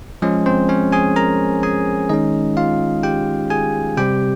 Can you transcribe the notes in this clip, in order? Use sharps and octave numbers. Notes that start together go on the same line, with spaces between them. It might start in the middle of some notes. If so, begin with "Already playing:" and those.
F3 G#3 C#4 G#4
C4 C5
C#4 C#5
G#4 G#5
A#4 A#5
G#4 G#5
D#3 G#3 C#4 D#4 D#5
F4 F5
G4 G5
G#4 G#5
C3 G3 C4 G4 G5